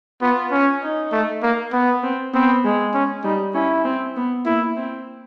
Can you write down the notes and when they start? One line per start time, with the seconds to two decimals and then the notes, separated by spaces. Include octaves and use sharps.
0.22 B3 F4
0.52 C#4
0.82 D#4
1.12 A3
1.43 A#3
1.73 B3
2.03 C4
2.34 B3 C4
2.65 G#3
2.94 C#4
3.24 G3 D#4
3.54 C#4 E4
3.85 C4
4.16 B3
4.46 A#3 E4
4.76 C4